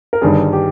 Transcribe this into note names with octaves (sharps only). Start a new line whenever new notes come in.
A#4
G1 G2 D#3 G3 G#4
G4